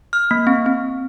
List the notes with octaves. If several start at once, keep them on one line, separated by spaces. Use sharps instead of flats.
F6
A#3
C4
C4